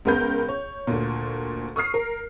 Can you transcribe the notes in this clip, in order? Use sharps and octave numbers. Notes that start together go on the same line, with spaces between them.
C#2 B3 A#4 B5 G6
C#5
D2 A#2
C#6 D#6 F6 C7
A#4